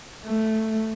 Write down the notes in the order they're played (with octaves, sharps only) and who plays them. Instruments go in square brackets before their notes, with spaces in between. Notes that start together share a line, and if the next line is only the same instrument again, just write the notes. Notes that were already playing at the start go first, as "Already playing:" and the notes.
[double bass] A3